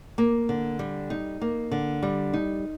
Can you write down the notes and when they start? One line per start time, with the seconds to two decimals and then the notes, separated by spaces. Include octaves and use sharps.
0.18 A#3
0.49 D3
0.79 G3
1.10 D#4
1.41 A#3
1.71 D3
2.03 G3
2.33 D#4